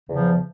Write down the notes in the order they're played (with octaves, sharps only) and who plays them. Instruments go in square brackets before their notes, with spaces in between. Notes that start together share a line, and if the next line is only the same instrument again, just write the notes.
[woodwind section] E2 C#3 F3